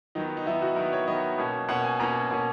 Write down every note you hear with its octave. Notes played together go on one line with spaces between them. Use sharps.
D#3 F#3 B3 D#4
D#4
D#3 F#3 B3 E4
F#4
D#3 F#3 B3 A#4
C#5
D#3 F#3 B3 D#5
B2 A#3 C#4
B2 A#3 C#4 F#5
G#5
B2 A#3 C#4 A#5
B2 A#3 C#4